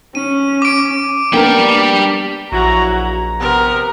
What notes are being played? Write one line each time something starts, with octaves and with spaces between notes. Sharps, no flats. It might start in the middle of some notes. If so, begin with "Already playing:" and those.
C#4 D#7
D6 D7
G3 A#3 B3 D4 A#4 G5
A#1 F#3 E4 F#4 A#5
A#5
C3 B3 A#4